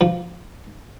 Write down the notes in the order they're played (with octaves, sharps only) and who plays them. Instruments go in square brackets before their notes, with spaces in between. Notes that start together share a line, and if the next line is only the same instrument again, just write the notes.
[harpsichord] F3